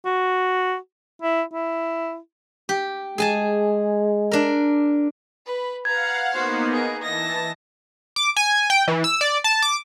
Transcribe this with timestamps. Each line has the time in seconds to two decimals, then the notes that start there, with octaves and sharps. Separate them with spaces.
0.05 F#4
1.22 E4
1.53 E4
2.69 G4
3.18 G#3 G#4 G#5 A5
4.31 D4 A#4
5.46 B4 B5
5.85 B4 F5 F#5 A#5 G#6
6.33 A#3 B3 D#4 F#4 C5
6.71 G#4
7.02 E3 D#5 A5 A#6
8.16 D6
8.36 G#5
8.70 G5
8.88 E3
9.04 E6
9.21 D5
9.44 A5
9.62 D6